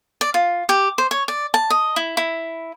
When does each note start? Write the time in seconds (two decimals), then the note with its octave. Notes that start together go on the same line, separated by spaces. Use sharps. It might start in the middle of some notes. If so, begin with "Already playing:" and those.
0.21 D5
0.34 F4
0.69 G4
0.98 C5
1.11 C#5
1.28 D5
1.54 A5
1.70 D#5
1.96 E4
2.17 E4